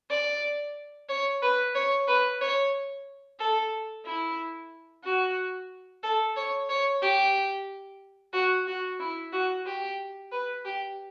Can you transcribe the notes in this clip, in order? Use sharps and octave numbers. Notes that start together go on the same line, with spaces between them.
D5
C#5
B4
C#5
B4
C#5
A4
E4
F#4
A4
C#5
C#5
G4
F#4
F#4
E4
F#4
G4
B4
G4